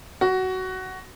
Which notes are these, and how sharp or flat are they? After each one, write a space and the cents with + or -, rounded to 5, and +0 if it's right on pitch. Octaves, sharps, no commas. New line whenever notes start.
F#4 +15